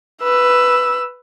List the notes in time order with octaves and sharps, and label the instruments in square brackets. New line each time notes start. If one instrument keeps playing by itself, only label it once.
[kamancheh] B4 E6